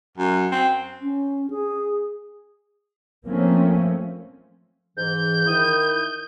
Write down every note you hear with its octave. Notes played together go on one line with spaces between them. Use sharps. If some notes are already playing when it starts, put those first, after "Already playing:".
F#2
C4
C#4
G#4
F3 A3 A#3 C4 C#4
G#2 E3 G6
D#3 E4 D#6